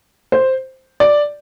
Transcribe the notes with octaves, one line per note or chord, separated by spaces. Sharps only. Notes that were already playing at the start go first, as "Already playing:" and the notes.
C5
D5